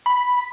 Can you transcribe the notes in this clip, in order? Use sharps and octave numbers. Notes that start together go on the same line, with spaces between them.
B5